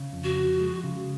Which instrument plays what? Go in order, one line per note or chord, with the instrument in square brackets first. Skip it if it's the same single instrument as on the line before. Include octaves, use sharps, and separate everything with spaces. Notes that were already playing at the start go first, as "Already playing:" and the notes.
Already playing: [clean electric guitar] C#3
F2
[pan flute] F#4
[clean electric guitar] F3
G#3
C#3